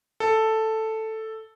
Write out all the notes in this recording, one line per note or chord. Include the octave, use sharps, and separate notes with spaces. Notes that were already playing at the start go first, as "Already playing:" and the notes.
A4